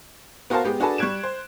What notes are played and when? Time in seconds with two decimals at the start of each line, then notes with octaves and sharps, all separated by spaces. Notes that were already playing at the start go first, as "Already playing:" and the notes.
0.50 B3 F#4 A#4 C5 F5 A5
0.65 G#3 B3 G4
0.80 D4 F#4 G#4 A4 B4 A5
0.98 G3 C#6 F#6 G#6 D7 E7
1.23 C5